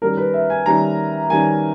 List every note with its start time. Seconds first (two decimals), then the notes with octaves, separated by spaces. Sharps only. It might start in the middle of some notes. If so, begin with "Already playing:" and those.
0.02 D#3 G3 C#4 A#4
0.17 B4
0.34 E5
0.50 G#5
0.66 D#3 G3 C#4 A#5
1.30 D#3 G3 C#4 G#5